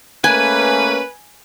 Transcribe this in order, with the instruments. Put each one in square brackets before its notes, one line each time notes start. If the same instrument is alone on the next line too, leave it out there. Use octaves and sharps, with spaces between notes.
[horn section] A3 A#3 C#4 [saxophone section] B4 [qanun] G#5